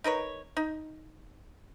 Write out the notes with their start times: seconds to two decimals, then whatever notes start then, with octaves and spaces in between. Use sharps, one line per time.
0.04 D#4 A#4 B4 C#5
0.57 D#4